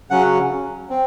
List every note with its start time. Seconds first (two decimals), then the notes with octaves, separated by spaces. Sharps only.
0.10 C#3 F#3 C#4 F#5
0.90 C4